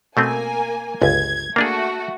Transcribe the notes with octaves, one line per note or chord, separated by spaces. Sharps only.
B2 A3 A#3 C4 G#5
G1 C#2 G#6
A3 A#3 D4 F#4 G#4